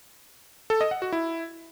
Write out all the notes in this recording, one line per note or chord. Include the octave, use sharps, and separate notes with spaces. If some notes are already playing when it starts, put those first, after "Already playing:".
A4
D#5
F#5
F#4
E4